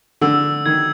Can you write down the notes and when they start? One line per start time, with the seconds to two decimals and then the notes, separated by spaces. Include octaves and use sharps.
0.21 D3 E6
0.66 D#3 G#6